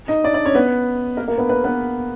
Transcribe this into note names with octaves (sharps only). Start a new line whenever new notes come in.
D#4 D#5
D4 D5
D4 D5
C#4 C#5
B3 B4
A#3 A#4
A#3 A#4
B3 B4
B3 B4
B3 B4